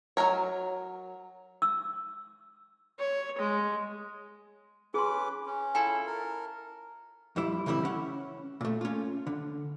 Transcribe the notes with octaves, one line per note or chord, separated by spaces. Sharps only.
F#3 A3 A#4 C#5
E6
C#5
G#3
C#4 G#4 B4 C6 D6
C#4
E4 F4 A4 G#5
A#4
F2 G3 E4
C#3 E3 G3 C4 E4
C#4 F#5
A#2 A3
C#4 F4
D3